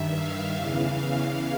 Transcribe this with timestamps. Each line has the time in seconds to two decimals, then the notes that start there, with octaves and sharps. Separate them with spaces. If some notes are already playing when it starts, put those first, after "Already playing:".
Already playing: G2 D#3 E5
0.13 F5
0.55 E2 C#3 E3